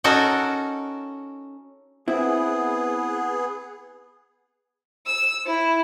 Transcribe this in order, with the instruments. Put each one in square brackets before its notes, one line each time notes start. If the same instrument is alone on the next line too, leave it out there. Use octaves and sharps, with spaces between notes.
[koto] C#4 D#4 F#4 A4 A#4
[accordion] B3 G#4 [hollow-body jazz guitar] C4 E4
[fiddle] E6
E4